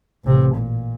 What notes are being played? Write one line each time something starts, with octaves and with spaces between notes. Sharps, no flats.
A1 C3
A#2